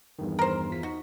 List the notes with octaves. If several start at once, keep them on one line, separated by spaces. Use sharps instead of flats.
E2 G2 D#3
A#4 C5
E2 F4 B6
D#4 F#4